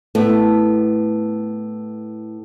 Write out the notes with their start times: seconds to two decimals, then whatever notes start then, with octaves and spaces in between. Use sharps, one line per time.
0.15 A2 A3 B3